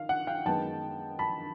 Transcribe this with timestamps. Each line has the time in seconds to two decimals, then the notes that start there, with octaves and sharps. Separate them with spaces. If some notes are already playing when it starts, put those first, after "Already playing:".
Already playing: D#3 F5
0.09 F#5
0.27 F5 G5
0.45 F#2 D#3 G#3 B3 G5 A5
1.19 A5 B5